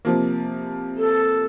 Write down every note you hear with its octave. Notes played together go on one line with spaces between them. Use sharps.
C3 F3 A#3
A4